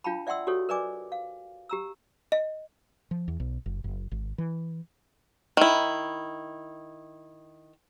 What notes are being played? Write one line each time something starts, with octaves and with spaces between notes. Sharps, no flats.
D4 F4 F5 G5 A5 B5
D5 E5 F#5 G5 C6 E6
F#4 G4 A4 C#5
A#4 B4 D5 D#5 G#5 D6
F5
G4 A#5 E6
D#5
F3
E2
B1
F#1
F#1
G#1
E3
D#3 E4